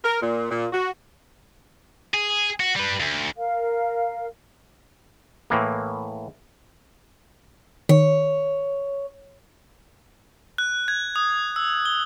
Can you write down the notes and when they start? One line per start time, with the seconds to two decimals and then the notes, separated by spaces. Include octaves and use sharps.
0.04 A#4
0.22 A#2
0.51 A#2
0.73 F#4
2.14 G#4
2.60 F#4
2.76 G3 B4
3.00 D2
3.37 A#4 F5
5.50 A2 E3 A#3
7.89 D#3 C#5
10.58 F#6
10.88 G#6
11.16 D#6
11.56 E6
11.85 G7